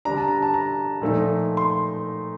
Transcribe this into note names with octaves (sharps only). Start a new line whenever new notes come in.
D3 G3 D4 A#5
A5
A#5
A5
A#5
A#2 F3 A3 D#4
C6